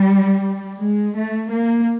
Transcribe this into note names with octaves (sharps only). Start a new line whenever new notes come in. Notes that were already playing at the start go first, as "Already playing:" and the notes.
Already playing: G3
G#3
A3
A#3